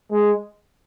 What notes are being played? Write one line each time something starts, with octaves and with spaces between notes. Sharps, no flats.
G#3